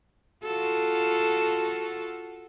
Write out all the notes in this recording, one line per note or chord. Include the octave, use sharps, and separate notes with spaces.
F4 F#4 A4